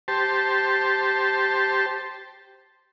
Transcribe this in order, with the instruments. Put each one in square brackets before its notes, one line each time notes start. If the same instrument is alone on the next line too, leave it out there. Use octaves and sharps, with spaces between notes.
[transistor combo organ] G4 C5 A5